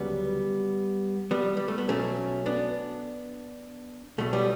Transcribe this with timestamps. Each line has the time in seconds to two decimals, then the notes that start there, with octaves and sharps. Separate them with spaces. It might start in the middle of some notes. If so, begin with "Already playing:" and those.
Already playing: D2 C#3 F#3 G3 B3
1.31 G3 B3
1.57 G3
1.68 A3
1.78 B3
1.88 B1 B2 F#3 A3 C#4
2.46 B3 D4
4.18 B1 B2 F#3 A3
4.33 G3 B3